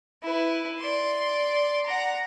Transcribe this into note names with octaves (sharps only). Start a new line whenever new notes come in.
E4 B4
D5 C6
F#5 A#5